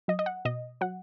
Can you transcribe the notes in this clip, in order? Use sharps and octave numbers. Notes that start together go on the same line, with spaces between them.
F#3 D#5
D#5
F#5
B2 D#5
F#3 F#5